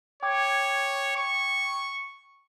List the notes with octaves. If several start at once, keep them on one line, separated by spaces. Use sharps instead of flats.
C#5 G5 D6 G#6
C#6